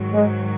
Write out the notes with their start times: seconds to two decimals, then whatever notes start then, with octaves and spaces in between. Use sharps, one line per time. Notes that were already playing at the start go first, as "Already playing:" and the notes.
Already playing: G#2 D#3 F#3
0.13 G#3